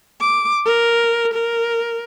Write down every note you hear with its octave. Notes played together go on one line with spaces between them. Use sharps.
D6
A#4
A#4